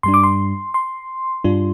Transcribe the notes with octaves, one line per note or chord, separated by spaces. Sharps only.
G2 G3 D4 C6
D6
C6
C6
G2 G3 D4 F4